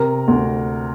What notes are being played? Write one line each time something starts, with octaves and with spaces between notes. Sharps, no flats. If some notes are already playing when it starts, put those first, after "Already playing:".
Already playing: C3 A#4
D2